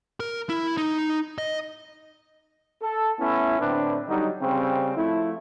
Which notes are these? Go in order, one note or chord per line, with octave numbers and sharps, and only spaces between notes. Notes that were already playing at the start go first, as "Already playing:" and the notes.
A#4
E4
D#4
D#5
A4
A3 B3 C#4 E4
A2 D3 C4 D4 B4
D3 F#3 G3 D#4
C#3 G3 C4
F3 A3 E4